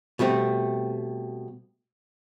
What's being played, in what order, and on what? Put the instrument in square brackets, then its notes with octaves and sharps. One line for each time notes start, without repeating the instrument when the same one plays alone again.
[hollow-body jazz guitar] B2 G3 A3 C4